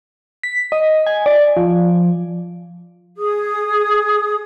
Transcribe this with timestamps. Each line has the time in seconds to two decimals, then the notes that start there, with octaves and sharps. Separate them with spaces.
0.43 B6
0.72 D#5
1.06 G#5
1.26 D5
1.57 F3
3.17 G#4 D#6